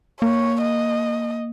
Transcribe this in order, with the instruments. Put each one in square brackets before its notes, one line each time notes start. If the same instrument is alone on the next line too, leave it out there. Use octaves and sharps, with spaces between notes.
[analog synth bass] A#3 [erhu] C#5
[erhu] D#5